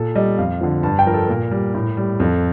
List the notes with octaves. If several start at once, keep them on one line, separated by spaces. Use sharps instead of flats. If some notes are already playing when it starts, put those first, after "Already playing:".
Already playing: A#2 A4
G3 D#5
F2 F5
D3 F3
G2 A5
G5
F3 A#4
A4
A#2 A#4
G3
A2
G3
F2 A4